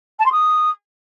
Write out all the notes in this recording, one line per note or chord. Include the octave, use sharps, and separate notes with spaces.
A5
C6
D#6